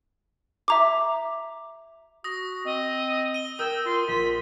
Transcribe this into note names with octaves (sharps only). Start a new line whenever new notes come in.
E5 A#5 D6
F#4 D#6 A#6
C4 D#5
D#7 G7
A#4 G5 D#6 E6 G#6
F4 C6
A#1 F4 B6